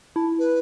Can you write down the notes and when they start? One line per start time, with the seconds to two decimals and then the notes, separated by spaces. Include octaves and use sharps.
0.16 E4 A5
0.38 B4